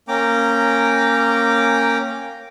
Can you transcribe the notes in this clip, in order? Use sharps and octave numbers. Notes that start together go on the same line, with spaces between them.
A#3 C#4 G5 A#5 D6